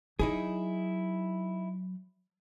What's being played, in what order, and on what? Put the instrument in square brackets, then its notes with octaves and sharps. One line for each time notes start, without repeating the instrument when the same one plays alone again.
[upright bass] F#3 [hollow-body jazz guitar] D#4 E4 G#4